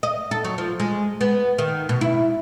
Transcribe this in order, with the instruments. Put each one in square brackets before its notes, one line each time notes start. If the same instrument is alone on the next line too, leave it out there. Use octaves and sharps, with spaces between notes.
[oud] D#5
A4
F#3
F3
G#3
B3
D#3
B2
E4